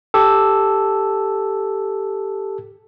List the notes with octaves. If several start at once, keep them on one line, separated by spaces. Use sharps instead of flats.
G4 A4